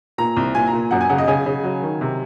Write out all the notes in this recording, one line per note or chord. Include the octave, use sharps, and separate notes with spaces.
A#2 A#5
C2
A#2 G#5
A#5
A#2
F#2 F#5
G#5
C#3 F#5
D#5
C#3 G#5
C#3
F#3
D#3
C3